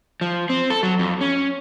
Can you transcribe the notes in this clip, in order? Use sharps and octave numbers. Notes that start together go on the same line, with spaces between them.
F3
C4
A4
F#3
F2
C#4